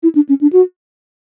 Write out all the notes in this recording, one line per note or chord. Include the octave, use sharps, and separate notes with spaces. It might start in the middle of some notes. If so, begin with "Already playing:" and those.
E4
D4
C#4
D4
F#4